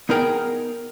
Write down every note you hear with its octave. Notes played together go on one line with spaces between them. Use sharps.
B3 D#4 G#4 A#4 F#5 G5